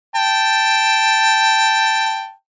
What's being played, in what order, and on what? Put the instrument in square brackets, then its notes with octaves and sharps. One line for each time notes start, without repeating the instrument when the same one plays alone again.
[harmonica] G5 A5